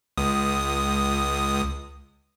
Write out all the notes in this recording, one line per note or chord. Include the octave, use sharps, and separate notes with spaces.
C#2 D#6